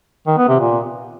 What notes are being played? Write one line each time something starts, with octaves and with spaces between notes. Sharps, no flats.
D#3
B3
C3
A#2